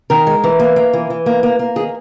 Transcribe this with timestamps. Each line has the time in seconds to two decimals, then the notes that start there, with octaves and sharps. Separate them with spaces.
0.10 D#3 A#4
0.27 G#3
0.44 E3
0.60 A#3
0.76 A#3
0.93 E3
1.10 E3
1.26 A#3
1.43 A#3
1.59 A#3
1.76 D#3 G#4